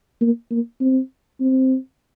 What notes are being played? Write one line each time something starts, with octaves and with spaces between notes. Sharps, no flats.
A#3
A#3
C4
C4